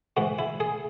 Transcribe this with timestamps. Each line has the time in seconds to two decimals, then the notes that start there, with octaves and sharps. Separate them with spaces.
0.17 G#2 E3 F#4
0.39 E4
0.60 G#4